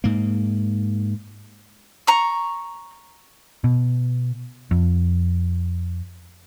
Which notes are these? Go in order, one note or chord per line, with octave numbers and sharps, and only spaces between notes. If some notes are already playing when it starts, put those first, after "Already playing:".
G#2 A#3
A#5 C#6
B2
F2